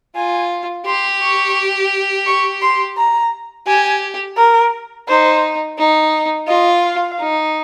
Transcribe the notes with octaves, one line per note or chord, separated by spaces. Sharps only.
F4 G#5
G4 C6
C#6
C#6
C6
A#5
G4 G#5
A#4
D#4 C5
D#4
F4 D#5
F5
D#4